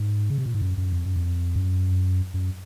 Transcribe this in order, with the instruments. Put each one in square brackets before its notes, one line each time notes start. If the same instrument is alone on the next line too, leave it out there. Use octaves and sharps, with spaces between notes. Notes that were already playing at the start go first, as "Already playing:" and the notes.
Already playing: [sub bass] G#2
C#3
C3
A#2
G#2
F#2
F#2
F2
F#2
F2
F#2
F#2